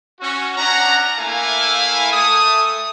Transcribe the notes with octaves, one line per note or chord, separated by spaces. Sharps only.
C#4 F#4
C#4 D4 F#5 A#5
A3 A#3 E4 F5 G#5
A3 D#6